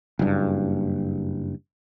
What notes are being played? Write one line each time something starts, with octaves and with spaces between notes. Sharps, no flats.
F#1 G2